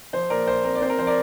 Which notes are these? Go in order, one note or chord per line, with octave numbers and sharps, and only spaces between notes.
F3 C5
A#2 A#4 D5
A#1 C5
C4 A#4
D5
C4 C5
A#4
F3 C5
A#4 D5